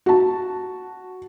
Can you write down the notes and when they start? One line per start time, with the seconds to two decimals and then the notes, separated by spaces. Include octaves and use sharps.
0.06 F#4 A5